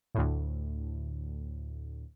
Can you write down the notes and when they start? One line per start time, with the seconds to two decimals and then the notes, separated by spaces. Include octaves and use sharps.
0.15 D2 A2